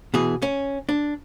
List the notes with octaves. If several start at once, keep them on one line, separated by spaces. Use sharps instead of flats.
B2 E3 G#4
C#4
D4